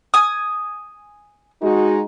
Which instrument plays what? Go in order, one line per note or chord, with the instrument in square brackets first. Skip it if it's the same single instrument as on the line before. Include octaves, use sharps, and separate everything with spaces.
[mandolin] G#5 D#6
[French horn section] G#3 D#4 F#4